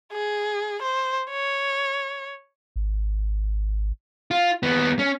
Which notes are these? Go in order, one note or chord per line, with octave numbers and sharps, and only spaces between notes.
G#4
C5
C#5
G#1
F4
D#2 B3
C#4